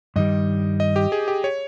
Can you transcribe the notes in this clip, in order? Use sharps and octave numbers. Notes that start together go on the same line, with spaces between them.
G2 D#3 G3 D#5
D#5
G4
G#4
G4
C#5